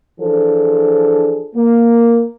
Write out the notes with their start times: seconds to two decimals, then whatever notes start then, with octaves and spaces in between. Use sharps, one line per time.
0.20 E3 F3 D4 G#4 A4
1.55 A#3